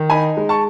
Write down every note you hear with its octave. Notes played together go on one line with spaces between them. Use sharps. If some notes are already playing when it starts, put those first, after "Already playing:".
Already playing: D#3
D#4 G#5 B5
G#3
A5 C#6